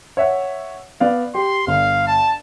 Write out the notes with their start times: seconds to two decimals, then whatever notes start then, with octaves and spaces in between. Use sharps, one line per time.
0.17 C#5 E5 F#5
1.00 B3 D5 F5
1.35 G4 C6
1.67 G1 F5
2.07 A5